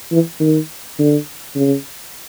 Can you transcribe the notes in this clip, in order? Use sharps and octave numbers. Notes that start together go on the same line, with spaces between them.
E3
D#3
D3
C#3